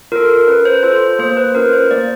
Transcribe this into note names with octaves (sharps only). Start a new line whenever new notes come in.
F4 A4 A#4
A#4
C#4 B4
C5
F4 A4 C5
A#3 C5
C5
B4
C#4 F4 A#4
C5
A#3 D5